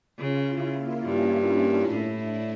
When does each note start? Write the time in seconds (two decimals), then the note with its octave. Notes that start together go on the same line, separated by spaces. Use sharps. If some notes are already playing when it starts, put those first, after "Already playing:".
0.17 C#3 F4
0.46 E4
0.75 A#3
1.04 G2 C#4
1.47 D4
1.90 A2 E4
2.20 D4